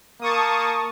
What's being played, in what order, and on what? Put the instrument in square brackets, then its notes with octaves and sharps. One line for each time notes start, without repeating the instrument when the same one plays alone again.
[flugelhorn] A#3 [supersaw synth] A5 C#6 D#6